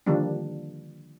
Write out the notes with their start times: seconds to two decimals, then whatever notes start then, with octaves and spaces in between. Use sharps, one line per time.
0.06 D3 D#3 F3 G3 A#3 D4